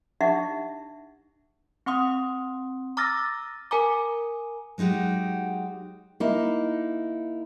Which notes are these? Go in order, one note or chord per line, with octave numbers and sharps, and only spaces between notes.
D4 D#4 G4 E5 F#5 D6
C4 F#5 C6 D#6
A#5 D6 E6 F6 A6 A#6
A#4 G#5 A#5 D6
F#3 G#3 D#4 F#4 G4
A#3 D#4 E4